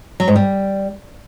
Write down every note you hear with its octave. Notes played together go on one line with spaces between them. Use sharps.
F#3
G#2
G3